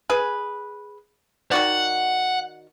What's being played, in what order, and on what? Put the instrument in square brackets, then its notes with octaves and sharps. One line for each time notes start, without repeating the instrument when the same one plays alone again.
[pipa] G#4 B4
[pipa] D#3 F#4 D5 [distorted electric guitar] F#5